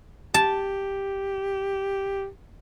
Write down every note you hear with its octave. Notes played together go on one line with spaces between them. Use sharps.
G4 A5